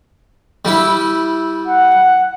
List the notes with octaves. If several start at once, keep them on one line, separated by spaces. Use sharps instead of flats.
G3 E4
F#5